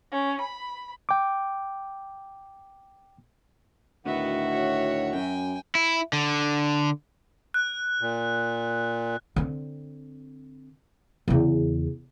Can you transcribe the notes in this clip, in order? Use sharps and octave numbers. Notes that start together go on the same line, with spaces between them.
C#4
B5
G5 D6
D2 A2 D#3 B3 F#4 E5 F#5
C#5
F#2 G5 G#5
E4
D3
F#6
A#2
D3 C4
E2 C#3